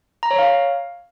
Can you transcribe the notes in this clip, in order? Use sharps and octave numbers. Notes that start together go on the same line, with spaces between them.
A#5
C#5
F5